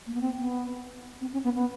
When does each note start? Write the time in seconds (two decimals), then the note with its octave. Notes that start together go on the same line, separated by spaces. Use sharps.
0.07 A#3
0.14 B3
0.21 C4
0.38 B3
1.21 C4
1.33 C#4
1.44 B3
1.55 B3